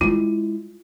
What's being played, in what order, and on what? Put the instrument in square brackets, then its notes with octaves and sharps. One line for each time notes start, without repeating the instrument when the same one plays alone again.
[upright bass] G#3 E4 [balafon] F4